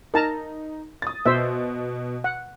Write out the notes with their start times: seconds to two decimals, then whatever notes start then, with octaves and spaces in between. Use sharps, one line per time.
0.14 D#4 A#4 A5 A#5
1.02 D#6 A6
1.26 B2 C5 E5
2.24 F#5